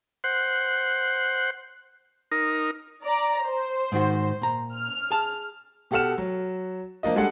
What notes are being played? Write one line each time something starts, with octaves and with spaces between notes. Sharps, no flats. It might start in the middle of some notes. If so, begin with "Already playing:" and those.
C5 F#5
D#4 A#4
D5 A#5
C5
G#2 D#3 F#4
A#2 A#5
F6
G#4 A5
B2 G4 A4 F#5 F6 E7
F#3
F3 A#3 D4 F4 D#5
G3 G#3 D4 G#4 A4 F#5